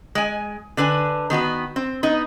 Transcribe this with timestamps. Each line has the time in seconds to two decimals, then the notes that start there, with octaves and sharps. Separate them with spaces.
0.15 G#3 G#5
0.77 D3 D4 B4 G#5
1.30 D#3 B3 F#4 B4
1.76 C4
2.03 B3 D#4